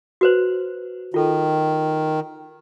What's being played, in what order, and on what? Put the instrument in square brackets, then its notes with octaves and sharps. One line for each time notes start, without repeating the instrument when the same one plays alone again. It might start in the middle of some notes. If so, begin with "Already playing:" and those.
[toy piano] F#4 B4 C5
[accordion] D#3 [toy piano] F4 A4